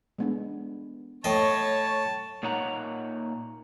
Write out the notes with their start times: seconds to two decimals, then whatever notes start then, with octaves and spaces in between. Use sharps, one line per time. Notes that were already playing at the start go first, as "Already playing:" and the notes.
0.18 G#3 B3 D4
1.24 A2 C#5 D#5 A5
2.43 A#2 A#3 D#4 C#5 F#5 A#5